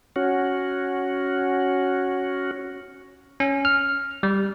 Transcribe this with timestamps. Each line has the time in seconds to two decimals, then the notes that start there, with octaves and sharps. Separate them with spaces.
0.16 C#4 F#4
3.40 C#4
3.65 F6
4.23 G3